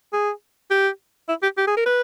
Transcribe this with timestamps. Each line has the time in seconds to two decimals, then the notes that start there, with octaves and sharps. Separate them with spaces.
0.13 G#4
0.71 G4
1.29 E4
1.43 G4
1.58 G4
1.68 G#4
1.77 A#4
1.86 B4